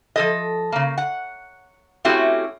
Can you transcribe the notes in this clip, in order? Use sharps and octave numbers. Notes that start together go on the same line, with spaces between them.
F3 A4 D#5
C#3 A#3
F#5
A3 C4 C#4 E4 F#4 G4